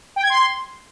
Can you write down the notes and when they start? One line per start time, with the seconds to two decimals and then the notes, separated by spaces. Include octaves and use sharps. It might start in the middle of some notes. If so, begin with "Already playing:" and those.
0.16 G5
0.23 G#6
0.30 C6